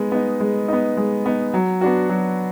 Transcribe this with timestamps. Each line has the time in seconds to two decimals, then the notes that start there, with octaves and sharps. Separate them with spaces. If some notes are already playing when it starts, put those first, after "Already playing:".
Already playing: G#3 B3 D#4
0.12 B3 D#4
0.40 G#3
0.68 B3 D#4
0.97 G#3
1.26 B3 D#4
1.54 F#3
1.81 B3 D4 F#4
2.09 F#3